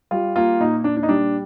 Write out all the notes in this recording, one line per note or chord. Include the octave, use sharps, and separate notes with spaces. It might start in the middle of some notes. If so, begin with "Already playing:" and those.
G3 F4
A#3 F4
A#2 D#4
A#2 D4
D4
D#4
G3 D4